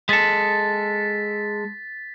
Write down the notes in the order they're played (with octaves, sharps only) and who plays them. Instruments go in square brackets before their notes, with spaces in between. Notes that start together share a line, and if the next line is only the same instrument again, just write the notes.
[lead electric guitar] G#3 A4 [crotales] A6 B6